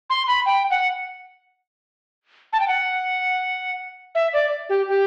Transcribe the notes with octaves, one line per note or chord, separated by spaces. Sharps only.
C6
B5
G5
F#5
A5
G5
F#5
E5
D5
G4
G4